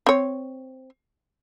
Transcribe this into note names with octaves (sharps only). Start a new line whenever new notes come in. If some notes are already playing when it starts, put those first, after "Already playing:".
C4 C#5